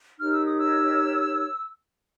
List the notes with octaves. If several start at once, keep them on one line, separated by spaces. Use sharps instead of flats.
D#4 G4 A#4 C#5 F6
E6
D#6
E6